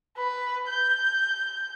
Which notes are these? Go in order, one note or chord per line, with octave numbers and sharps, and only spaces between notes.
B4
G6